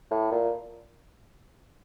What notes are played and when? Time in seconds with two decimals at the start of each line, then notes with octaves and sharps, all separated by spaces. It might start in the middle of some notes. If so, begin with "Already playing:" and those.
0.11 A2
0.32 A#2